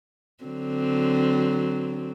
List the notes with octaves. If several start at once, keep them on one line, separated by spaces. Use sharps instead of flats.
D3 F#3 C4